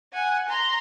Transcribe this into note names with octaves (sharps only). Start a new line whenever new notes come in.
F#5 G#5
A#5 C6